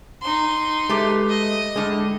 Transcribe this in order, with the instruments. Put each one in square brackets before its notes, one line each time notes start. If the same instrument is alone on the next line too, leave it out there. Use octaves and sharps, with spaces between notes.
[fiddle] D#4 C6
[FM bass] G#3 [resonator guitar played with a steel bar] A3 G4 B4
[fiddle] D#5
[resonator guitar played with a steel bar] A2 D3 [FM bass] G#3